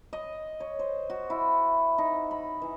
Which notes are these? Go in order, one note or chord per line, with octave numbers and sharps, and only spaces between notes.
D#5
C#5
C5
F#4
E4
D#4
B5
E3